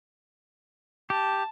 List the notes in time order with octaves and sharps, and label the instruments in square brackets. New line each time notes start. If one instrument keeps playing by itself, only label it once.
[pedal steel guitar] G4 [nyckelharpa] A5